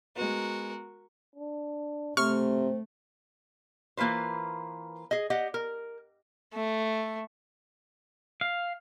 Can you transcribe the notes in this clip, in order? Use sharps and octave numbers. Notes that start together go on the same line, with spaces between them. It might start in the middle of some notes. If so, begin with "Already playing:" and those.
G#3 B3 F#4 A#4
D4
C3 A3 C4 C#6 F6
E3 A#3 F4 B4 C5
G#4 D#5
G4 D#5 F#5
A#4
A3
F5